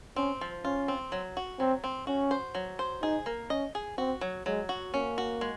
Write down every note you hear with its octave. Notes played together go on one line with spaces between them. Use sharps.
C4 C#4
F3
C#4 F4
C4
F#3
F#4
F#3 C4
C4
C#4 F#4
C5
F#3
C5
D#4 G#4
A#3
C#4 D#5
G#4
C4 F#4
F#3
F#3 G#3
F#4
A#3 C#4
F#4
G#3